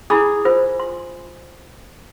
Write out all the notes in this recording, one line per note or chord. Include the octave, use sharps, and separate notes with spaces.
E4 G#4 B5 D6
F4 A#4 C5
C6